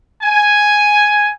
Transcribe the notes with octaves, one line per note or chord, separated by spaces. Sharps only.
G#5